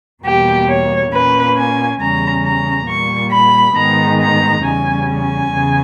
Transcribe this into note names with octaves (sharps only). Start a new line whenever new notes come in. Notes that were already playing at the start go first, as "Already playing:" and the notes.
E2 B2 G3 A#3 G4
C#5
A#2 A#3 C#4 B4
G#5
E2 C#3 G3 C#4 A#5
A#5
A#2 G3 A#3 C#6
B5
G#2 D#3 G#3 B3 D#4 A#5
A#5
E2 C#3 G3 C#4 G#5
G#5
E2 C#3